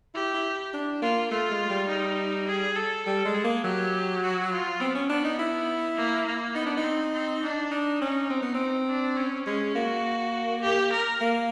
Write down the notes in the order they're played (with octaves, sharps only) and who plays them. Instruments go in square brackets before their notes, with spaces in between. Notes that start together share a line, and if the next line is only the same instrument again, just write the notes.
[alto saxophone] E4 [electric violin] G4
[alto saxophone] E4
D4
[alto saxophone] A#3 [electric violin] F4
[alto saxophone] A3 [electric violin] F4
[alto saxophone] G#3
G3
[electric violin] D#4
G#4
A4
[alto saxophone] G3 [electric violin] A4
[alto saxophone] G#3
[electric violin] G#4
[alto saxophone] A#3
[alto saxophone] F#3 [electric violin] G4
[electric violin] F#4
F4
[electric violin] B3 [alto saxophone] C4
[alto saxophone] C#4
[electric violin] B3 [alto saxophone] D4
[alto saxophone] D#4
E4
[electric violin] A#3
A#3
[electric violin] B3 [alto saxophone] D#4
[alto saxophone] D4
D#4
[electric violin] C4
C4
D4
[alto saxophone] D4 [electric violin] D#4
[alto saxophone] C#4
C4
B3
C4
[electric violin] D4
C#4
[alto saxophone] G#3 [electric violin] C#4
[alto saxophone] A#3 [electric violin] F#4
[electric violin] G4
A#4
[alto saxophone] A#3